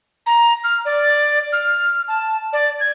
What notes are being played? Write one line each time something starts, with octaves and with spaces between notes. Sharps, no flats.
A#5
F6
D5
F6
A5
D5
G#6